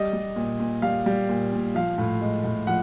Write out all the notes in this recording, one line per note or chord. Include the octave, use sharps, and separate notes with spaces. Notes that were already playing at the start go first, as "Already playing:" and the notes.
Already playing: G3 D#5
G3
A#2
A#2
G3 F5
G3
A#2
A#2
F3 F5
A2
G#3
A2
F3 F#5